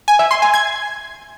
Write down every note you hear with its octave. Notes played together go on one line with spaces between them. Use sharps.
G#5
E5
C6
G#5
G#6